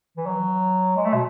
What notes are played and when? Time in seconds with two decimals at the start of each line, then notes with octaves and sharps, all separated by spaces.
0.17 E3
0.26 F#3
0.96 G#3
1.05 A3
1.14 B2